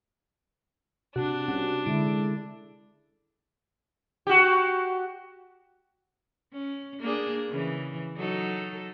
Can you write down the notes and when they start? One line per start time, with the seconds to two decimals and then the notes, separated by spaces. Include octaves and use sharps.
1.16 C3 D4 F#4
1.48 C2 C#4 F#4
1.86 D3 G#3 E4 D7
4.27 F#4 G4
6.53 C#4
7.00 A#3 D4 G#4
7.49 C#3 E3
8.16 F#3 D#4 A4